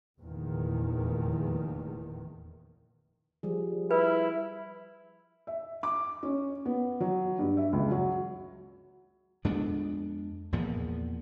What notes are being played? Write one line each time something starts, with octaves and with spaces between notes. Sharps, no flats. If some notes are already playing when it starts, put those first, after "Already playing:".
F1 E2 A#2 D#3
F3 G3 G#4
E4 B4
E5
D6
C#4
B3
F#3
G2
E5
C#2
F#3
F2 G#3 B3 D4
E2 A#2 F3 B3